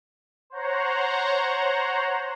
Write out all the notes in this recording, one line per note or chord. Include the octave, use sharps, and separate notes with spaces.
C5 C#5 F#5 A#5